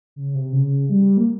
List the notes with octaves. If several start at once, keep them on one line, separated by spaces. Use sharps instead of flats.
C#3
C3
C#3
G3
A#3